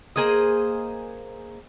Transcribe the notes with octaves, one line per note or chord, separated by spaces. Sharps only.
A#3 G#4 C5 D#5